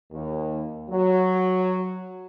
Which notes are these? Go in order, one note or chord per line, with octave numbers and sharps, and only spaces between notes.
D#2
F#3